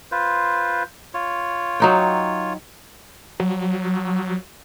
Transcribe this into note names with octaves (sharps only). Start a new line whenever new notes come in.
F4 B4 C5
F4 C#5
F#3 D#4 G5
F#3